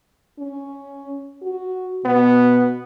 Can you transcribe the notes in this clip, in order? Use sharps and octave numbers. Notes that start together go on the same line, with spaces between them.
C#4
F#4
B2 B3